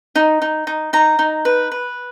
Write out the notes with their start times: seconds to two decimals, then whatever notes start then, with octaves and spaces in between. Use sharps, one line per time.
0.15 D#4
0.42 D#4
0.67 D#4
0.93 D#4 A#5
1.19 D#4
1.45 B4
1.71 B4